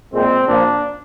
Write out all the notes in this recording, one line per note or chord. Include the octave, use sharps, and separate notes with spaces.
A#2 G#3 C4
A#2 F3 A#3 D4